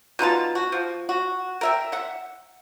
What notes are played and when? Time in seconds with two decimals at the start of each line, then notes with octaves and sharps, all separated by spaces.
0.19 B2 D#4 F4 A5
0.55 F#4
0.72 F3
1.09 F#4
1.61 A#4 E5 G5
1.92 E5 F#5